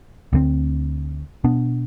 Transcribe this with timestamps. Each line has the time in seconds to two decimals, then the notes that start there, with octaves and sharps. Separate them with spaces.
0.33 D2 D3 A3 C4
1.44 B2 B3 D4